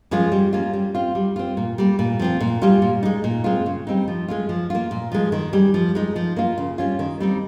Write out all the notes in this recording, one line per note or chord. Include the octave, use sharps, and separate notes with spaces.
F3 G#3 C#4 F4
G3
A#3 C#4 F4
G3
C4 F4
G3
C4 F4
A#2
G3 A#3
A#2
F3 C4 F4
A#2
G3 C#4 F4
A#2
G#3 D#4
A#2
G#3 C4 F4
C#3
G3 C4 D#4
F3
G#3 C#4 F4
F3
A#3 F4
A#2
F3 G#3
D#3
G3 C#4
F3
G#3 D#4
F3
A#3 F4
C#3
G3 C#4 F4
D#3
G3 C4 D#4